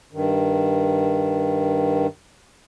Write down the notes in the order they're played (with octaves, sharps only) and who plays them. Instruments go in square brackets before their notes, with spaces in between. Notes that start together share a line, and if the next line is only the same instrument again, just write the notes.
[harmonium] G2 D#3